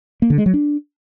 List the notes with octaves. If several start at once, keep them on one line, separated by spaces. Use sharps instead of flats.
A#3
D3
G#3
F#3
D4